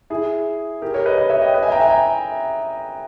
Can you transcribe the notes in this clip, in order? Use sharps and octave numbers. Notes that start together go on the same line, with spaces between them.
E4 G#4
G4 A#4
A#4 C#5
B4 D#5
B4 D#5
C#5 E5
D#5 G5
B4 D#5
E5 G#5
G5 A#5
E5 G#5
G5 A#5